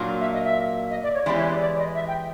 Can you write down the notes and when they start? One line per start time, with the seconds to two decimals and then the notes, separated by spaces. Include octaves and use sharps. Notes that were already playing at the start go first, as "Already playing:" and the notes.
Already playing: A#2 F#3 A#3 D4 F4
0.21 E5
0.33 D#5
0.44 E5
0.90 D#5
1.03 D5
1.14 C#5
1.26 E3 G#3 B3 E4 G4 D5
1.37 C#5
1.50 D5
1.61 D5
1.78 D#5
1.95 E5
2.08 G5